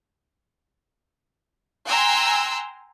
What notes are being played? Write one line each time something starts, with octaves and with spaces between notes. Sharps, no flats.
G5 G#5 A#5 C6 E6 F#6